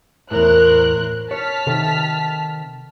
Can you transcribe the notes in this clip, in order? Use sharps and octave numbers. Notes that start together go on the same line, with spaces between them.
E2 A2 A#4 C5 F#6
C#5 A5 F6 B6
C3 D#3 A4